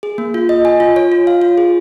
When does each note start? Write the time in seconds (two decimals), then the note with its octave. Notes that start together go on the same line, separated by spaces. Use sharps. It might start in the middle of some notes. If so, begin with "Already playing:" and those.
0.03 G#4
0.18 A#3
0.34 F4
0.49 D#5
0.65 G#5
0.80 F4
0.96 C#5
1.12 F4
1.27 F5
1.42 F4
1.58 G#4